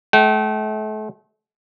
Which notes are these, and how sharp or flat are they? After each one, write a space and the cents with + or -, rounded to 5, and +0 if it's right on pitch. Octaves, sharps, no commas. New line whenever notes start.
A3 -40 G5 -40